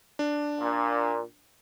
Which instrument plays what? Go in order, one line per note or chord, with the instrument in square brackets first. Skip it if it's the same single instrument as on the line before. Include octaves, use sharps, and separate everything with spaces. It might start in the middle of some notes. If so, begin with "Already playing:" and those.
[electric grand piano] D4
[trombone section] A#2